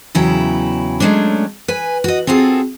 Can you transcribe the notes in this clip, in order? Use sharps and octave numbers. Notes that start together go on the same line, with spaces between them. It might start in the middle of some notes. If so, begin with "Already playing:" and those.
E2 C#3 F#3 E4 G5
F#3 G#3 A3 C#4 D4
B4 G#5
F#4 D#5
C4 F4 F#4 G#4 A4